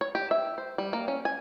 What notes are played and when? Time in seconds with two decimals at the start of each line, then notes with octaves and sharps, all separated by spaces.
0.01 C#5
0.15 G4
0.31 E5
0.58 C5
0.78 G3
0.93 A#3
1.08 C#4
1.25 G#5